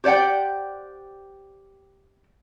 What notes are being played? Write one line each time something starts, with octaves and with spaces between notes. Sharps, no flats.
G4 C5 D5 F#5 G5